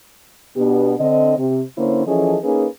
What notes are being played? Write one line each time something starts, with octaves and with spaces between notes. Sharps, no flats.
B2 B3 D4 G4
D3 C4 D#5
C3
D3 A#3 C#4 E4 C5 C#5
E3 F3 C#4 G#4 A4 D#5
A#3 C#4 D#4 G#4 B4